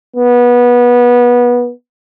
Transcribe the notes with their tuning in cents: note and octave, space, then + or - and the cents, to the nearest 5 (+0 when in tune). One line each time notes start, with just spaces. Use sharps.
B3 -20